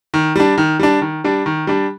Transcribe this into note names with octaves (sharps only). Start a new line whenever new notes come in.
D#3
G3 D4
D#3
G3 D4
D#3
G3 D4
D#3
G3 D4